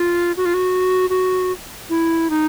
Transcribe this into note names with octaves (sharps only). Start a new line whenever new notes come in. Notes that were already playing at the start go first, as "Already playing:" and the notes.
Already playing: F4
F#4
F4
F#4
F#4
E4
D#4